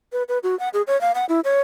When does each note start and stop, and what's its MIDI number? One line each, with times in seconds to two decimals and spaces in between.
0.13 0.23 71
0.29 0.39 71
0.43 0.58 66
0.59 0.69 78
0.74 0.82 68
0.87 0.99 73
1.01 1.12 77
1.15 1.25 78
1.29 1.40 64
1.44 1.61 73